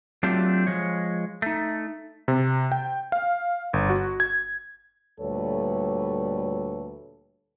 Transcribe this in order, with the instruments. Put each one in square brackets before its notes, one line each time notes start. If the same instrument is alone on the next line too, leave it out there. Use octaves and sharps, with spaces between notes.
[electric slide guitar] F#3 A3 C4 D4 F4 G4
F3 G#3 C#5
A3 D#4
[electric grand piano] C3
G5
F5
G1
F#4
G#6
[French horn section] D2 A#2 G3 A4 B4 C#5